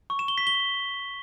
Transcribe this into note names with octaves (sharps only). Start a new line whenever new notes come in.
C#6
E7
G7
B6
G7